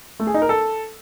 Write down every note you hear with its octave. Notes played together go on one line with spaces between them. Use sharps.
A3
G#4
D#4
A#4
A4